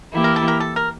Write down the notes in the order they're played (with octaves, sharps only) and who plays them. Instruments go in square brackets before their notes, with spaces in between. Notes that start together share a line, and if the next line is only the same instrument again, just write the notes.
[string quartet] E3 A#3 E4 G4
[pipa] A#4
A4
A#4
A4
A#4